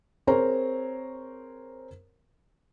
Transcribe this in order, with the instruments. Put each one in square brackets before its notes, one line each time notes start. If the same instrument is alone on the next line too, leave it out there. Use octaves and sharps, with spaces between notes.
[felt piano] C4 G#4 A#4 C5 C#5 A#5